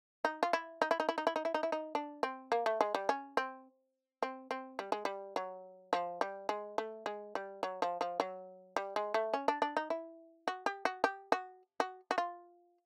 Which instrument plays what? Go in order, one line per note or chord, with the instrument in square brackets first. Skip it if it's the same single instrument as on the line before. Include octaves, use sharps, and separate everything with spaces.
[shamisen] D#4
F4
E4
D#4
E4
D#4
E4
D#4
E4
D#4
E4
D#4
E4
D#4
D4
C4
A#3
A3
G#3
G3
C#4
C4
C4
C4
G3
G#3
G3
F#3
F3
G3
G#3
A3
G#3
G3
F#3
F3
F3
F#3
G3
G#3
A3
C#4
D4
D4
D#4
E4
F#4
G4
F#4
G4
F#4
F#4
F#4
F4